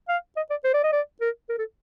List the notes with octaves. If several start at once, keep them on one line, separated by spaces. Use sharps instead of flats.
F5
D#5
D5
C5
D5
D#5
D5
A#4
A#4
A4